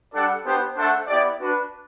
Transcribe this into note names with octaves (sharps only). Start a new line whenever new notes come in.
G3 D4 A4 D5 F#5
B3 D4 G4 C5
A3 D4 A4 C5 F#5
B3 E4 G4 D5
D4 F#4 B4